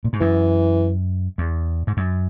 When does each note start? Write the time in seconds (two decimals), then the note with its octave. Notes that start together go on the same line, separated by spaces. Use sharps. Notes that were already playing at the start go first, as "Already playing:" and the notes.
0.04 A#2
0.13 G#2
0.20 F#2 E3
1.38 E2
1.87 G#2
1.97 F#2